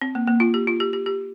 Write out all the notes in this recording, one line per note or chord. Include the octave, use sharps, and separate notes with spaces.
C4
A#3
A#3
F4
G4
F4
G4
G4
G4